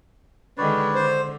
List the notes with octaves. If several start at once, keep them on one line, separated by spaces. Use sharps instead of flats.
D3 D#3 G#3 B4 C#5 D5
D3 C5